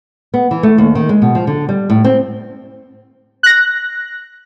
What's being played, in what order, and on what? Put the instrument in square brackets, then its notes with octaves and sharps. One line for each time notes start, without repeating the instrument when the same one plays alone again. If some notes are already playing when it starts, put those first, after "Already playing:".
[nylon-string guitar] B3
E3
A3
D#2
D#3
G#3
B2
F3
D3
G3
A2
C4
[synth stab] F#6 A#6